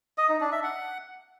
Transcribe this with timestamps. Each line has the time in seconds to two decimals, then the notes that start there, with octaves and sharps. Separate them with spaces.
0.18 D#5
0.29 D#4
0.41 D4
0.52 E5
0.63 F#5